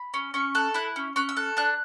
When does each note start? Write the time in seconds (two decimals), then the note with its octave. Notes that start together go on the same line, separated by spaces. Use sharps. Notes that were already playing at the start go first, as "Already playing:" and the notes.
Already playing: B5
0.14 C#4
0.34 C#4 C#6
0.55 A4 F#6
0.74 E4 F#6
0.96 C#4
1.16 C#4 F#6
1.29 E6
1.36 A4 F#6
1.57 D4 F#6